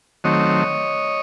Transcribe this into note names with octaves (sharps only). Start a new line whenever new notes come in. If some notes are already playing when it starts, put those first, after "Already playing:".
D#3 F#3 A3 C4 C#5 D#5